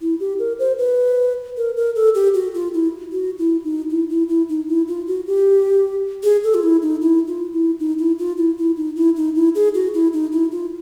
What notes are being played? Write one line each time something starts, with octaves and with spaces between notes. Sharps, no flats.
E4
G4
A#4
C5
B4
A#4
A#4
A4
G4
F#4
F4
E4
F#4
E4
D#4
E4
E4
E4
D#4
E4
F4
F#4
G4
G#4
A4
F4
E4
D#4
E4
F4
E4
D#4
E4
F4
E4
E4
D#4
E4
D#4
E4
G#4
F#4
E4
D#4
E4
F4